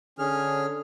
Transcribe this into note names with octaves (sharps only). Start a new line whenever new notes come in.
D3 C#4 G#4 F6